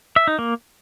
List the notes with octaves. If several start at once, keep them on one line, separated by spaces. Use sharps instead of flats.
E5
D#4
A#3